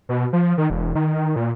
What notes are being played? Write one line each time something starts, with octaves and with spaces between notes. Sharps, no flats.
B2
F3
D#3
E1
D#3
A#2